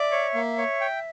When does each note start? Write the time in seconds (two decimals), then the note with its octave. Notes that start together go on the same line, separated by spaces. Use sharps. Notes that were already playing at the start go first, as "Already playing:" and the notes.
Already playing: D5 E5
0.11 C#5
0.35 A#3
0.58 C#5
0.81 G5